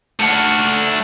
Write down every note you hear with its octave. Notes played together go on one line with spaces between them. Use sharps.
A3 F#5